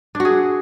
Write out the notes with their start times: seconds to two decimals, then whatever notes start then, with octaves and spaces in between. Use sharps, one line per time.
0.15 D4
0.20 F#4
0.25 G#4